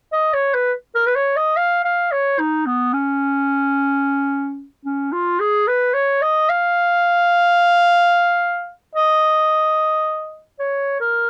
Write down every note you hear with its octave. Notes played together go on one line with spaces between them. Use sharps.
D#5
C#5
B4
A#4
B4
C#5
D#5
F5
F5
C#5
D#4
B3
C#4
C#4
F4
G#4
B4
C#5
D#5
F5
D#5
C#5
A#4